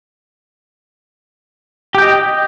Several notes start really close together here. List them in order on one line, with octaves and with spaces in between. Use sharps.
G4 G5 D#5